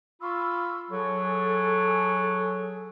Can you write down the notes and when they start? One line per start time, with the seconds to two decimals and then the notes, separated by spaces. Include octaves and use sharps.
0.22 F4 B5 C#6 E6
0.90 F#3 G#4 A4